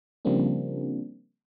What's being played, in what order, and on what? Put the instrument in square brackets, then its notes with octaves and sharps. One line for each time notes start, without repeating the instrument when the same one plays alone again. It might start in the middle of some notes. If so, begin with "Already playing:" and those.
[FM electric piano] C#3 F3 G3 A#3 C4 D4